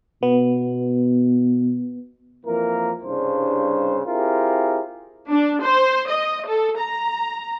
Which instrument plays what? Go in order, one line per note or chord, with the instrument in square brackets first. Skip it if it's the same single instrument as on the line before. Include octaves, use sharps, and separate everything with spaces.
[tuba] B2 [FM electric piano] B3
[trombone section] F2 E3 A#3 A#4
C2 G2 C#3 D4 C5
C4 E4 F4 G4 G#4 A#4
[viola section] D4
C5
D#5
A4
A#5